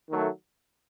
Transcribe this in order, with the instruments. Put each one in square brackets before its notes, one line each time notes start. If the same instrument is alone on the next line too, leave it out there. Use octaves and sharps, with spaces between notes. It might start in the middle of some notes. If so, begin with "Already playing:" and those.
[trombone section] D#3 F#3 A3